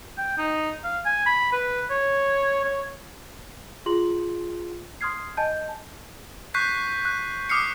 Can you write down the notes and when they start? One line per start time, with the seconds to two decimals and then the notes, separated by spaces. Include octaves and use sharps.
0.18 G5
0.38 D#4
0.84 F5
1.05 G#5
1.26 B5
1.52 B4
1.90 C#5
2.64 C#5
3.86 F4 G#4 C6 F#7
5.01 C6 D#6 F6 G#6 C7
5.37 D#5 G#5 A5 G6
6.54 C#6 F#6 G6 B6 C7
7.05 F#6
7.49 D6 D#6 F6 C7 C#7